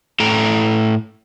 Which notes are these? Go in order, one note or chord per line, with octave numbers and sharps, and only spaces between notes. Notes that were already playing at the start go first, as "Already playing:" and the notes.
A2 A4 G5 A#5